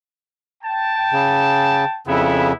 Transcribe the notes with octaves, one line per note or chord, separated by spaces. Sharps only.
G5 A5
C#3
F2 C#3 B3 E4